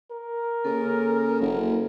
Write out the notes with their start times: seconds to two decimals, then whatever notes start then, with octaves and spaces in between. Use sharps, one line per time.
0.11 A#4
0.65 C#3 A#3 A4
1.41 F#1